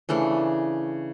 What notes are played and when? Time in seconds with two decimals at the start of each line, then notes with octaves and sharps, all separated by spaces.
0.09 C#3 E3 A3 D4